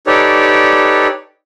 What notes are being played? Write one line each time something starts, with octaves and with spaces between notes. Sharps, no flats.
D#4 G4 A4 B4 C#5 D5